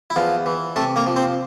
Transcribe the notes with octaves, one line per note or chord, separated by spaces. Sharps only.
E4
E2 F3 F4
E3
C3 A3 A4
A#3 A#4
F3
C4 C5